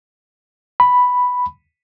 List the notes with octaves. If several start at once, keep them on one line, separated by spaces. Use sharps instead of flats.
B5